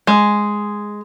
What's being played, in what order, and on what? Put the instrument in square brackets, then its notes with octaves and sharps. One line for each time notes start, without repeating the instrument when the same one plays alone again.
[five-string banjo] G#3